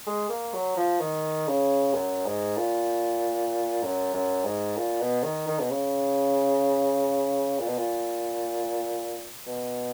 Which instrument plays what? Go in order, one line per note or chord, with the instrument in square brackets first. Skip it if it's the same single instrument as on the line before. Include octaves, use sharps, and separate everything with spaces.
[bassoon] G#3
A#3
F#3
F3
D#3
C#3
F#2
G#2
A#2
F#2
F#2
G#2
A#2
B2
D#3
D#3
B2
C#3
A#2
B2
A#2
B2